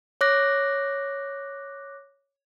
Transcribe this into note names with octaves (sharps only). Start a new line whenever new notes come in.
C#5 D6 F#6 A#6